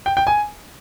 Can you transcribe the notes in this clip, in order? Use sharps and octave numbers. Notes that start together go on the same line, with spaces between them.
G5
G5
G#5